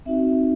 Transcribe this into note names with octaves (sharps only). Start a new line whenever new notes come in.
C4 D#4 F#4 E5